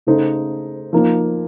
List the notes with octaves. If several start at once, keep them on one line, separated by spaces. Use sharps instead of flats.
C#3 A3 D#4 A4 C5
F3 A#3 D#4